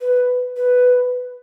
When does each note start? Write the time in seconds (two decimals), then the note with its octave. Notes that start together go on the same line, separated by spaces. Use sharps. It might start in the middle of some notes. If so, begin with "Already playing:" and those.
0.01 B4
0.57 B4